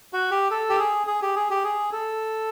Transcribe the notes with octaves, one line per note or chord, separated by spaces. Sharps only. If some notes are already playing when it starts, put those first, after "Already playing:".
F#4
G4
A4
G4
G#4
G#4
G4
G#4
G4
G#4
A4